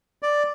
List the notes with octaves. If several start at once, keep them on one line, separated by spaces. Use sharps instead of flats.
D5